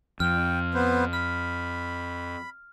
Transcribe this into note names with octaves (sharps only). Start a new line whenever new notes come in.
F2 G5 F6
B3 B4 C5
B5 F6